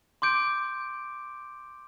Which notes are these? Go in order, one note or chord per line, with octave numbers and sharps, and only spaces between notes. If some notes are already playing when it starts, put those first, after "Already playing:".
C6 D6 G6 D7